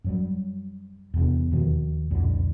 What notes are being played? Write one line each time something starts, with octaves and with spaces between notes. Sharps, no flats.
F#2 F#3 G3
E2 C3
D#2 B2 D#3 F3
C2 F2 A#2 D3